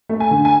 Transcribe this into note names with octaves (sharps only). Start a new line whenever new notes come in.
A3
G#5
D3
G#5